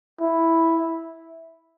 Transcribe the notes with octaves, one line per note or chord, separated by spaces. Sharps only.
E4